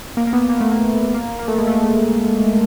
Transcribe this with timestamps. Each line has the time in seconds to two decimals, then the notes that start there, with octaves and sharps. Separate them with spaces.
0.17 A#3
0.27 A#3
0.33 B3
0.49 A#3
0.61 A3
0.71 A#3
1.14 A#3
1.39 A#3
1.48 A3
1.58 G#3
1.67 A3